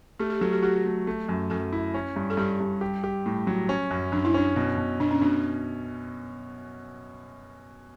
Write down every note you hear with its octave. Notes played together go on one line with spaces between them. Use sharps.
A3 G4
G4
F#3 A4
G4
F#4 G4
A3
A3
F#2
F#2 A4
E4
C#4
G2
A4
G2 G4
G2
G4
G4
A2
F#3
C#4
F#2
F#2 D4
E4
C#4 D4
B2
B2
B2 D4
C#4
B2 D4